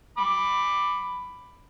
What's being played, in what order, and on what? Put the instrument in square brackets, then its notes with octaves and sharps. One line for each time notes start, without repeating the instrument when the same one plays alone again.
[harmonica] B5 D6